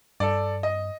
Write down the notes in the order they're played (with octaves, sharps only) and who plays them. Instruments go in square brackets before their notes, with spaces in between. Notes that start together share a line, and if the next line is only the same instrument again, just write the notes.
[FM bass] G2 [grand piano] A4 D5
[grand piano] D#5